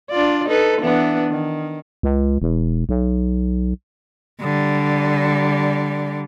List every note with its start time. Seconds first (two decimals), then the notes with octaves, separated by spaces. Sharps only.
0.11 D4 F4 D5
0.48 D#4 A4 B4
0.82 E3 B3 D4
1.31 D#3
2.03 C#2
2.42 E1
2.89 B1
4.40 D3 G3